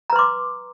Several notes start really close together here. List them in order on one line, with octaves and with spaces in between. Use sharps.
A#5 B4 C6 D6